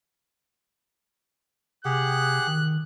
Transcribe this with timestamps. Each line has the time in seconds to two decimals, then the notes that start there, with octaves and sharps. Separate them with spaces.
1.85 C3 G4 G#4 F#5 F#6
2.47 D#3